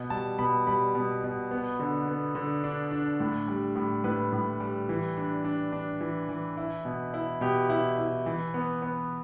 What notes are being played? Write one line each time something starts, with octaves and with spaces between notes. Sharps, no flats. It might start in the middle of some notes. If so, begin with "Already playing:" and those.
Already playing: B2
G3 A5
B2 B5
G3 B5
B2
B2
B3
D3
B3
D3
D4
D4
A2
G3
A2
A2 B4
A2
G3
E3
D4
D4
D4
E3
E3
E4
B2
E4
B2 G4
E4
E4
E3
B3
B3